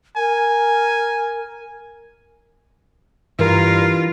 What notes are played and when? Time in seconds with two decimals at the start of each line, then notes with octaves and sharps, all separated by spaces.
0.16 A#4 G#5
3.39 G2 E3 F4 A#4